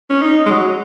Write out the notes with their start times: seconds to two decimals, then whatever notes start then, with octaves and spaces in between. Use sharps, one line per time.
0.10 C#4
0.22 D#4
0.46 G#3
0.50 F#3